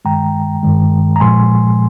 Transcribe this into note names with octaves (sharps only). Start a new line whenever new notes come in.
G2 D#3 G#3 G5 A#5
G2 D#3 G#3
A#5
A#2 F3 G#3 G#5 C6